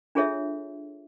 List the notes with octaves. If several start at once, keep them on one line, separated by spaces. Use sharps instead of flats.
D4 F4 G#4 A4 C#5 E5